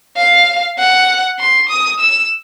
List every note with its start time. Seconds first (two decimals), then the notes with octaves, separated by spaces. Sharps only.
0.17 F5
0.78 F#5
1.39 C6
1.69 D#6
2.00 E6